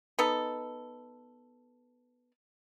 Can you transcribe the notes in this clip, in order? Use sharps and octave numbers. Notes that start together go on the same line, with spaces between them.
B3 D#4 A4